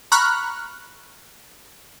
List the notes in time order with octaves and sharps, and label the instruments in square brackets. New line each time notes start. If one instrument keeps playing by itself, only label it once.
[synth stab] A#5 B5 C#6 F6 F#6